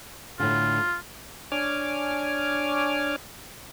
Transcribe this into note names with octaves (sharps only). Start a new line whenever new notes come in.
A2 D3 F4
D4 C#5 G#5 D6 F6